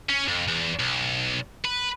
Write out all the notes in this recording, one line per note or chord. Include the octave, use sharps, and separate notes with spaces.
C#4
F2
E2
B1
B4